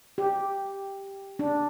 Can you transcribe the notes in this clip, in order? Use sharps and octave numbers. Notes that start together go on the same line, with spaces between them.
G4
D4